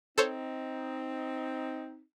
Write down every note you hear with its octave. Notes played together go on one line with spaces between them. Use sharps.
C4 D#4 A4 C5 C#5